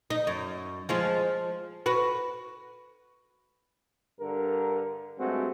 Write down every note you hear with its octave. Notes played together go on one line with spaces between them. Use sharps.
D#4
F#2
F3 G#3 F4
F#4 B4
G2 D3 A#4
G2 G#3 A3 C4 F#4